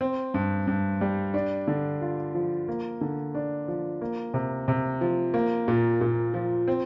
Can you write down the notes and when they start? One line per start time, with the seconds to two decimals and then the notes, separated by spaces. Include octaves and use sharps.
0.01 C4
0.34 G2
0.67 G2
1.01 G3
1.34 D4
1.68 D3
2.01 F4
2.35 F3
2.68 A#3
3.01 D3
3.35 D4
3.68 F3
4.01 A#3
4.34 C3
4.68 C3
5.01 F3
5.34 A#3
5.68 A#2
6.01 A#2
6.34 F3
6.68 C4